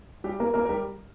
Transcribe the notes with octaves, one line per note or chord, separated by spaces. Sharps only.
G3 G4
A#3 A#4
A#3 A#4
A#4
G3 G4